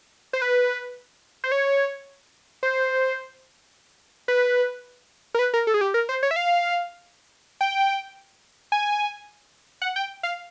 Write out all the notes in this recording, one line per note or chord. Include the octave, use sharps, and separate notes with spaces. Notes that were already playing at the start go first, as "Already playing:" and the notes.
C5
B4
C5
C#5
C5
B4
A#4
B4
A#4
A4
G#4
G4
A#4
C5
C#5
E5
F5
G5
G#5
F#5
G5
F5